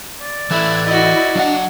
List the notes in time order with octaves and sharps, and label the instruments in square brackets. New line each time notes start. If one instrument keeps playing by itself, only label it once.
[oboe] D5
[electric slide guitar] E3 A4 [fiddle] E4 [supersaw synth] E6 F#6 G#6
[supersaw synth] E4 [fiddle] F#4 D#5
[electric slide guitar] F#3 F5 F#5 [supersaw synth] D4